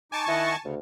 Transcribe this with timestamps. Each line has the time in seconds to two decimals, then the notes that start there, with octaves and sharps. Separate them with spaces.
0.12 D#4 G#5 A5 C#6 D6
0.28 D#3 E4 D#5 F#5
0.64 D2 C#3